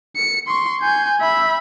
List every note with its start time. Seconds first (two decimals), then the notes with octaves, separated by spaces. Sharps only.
0.17 C#7
0.48 C6 C#6
0.82 G#5 G6
1.21 E5 B5